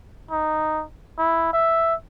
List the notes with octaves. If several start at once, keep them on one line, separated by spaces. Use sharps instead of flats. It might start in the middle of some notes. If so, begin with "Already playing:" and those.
D#4
E4
E5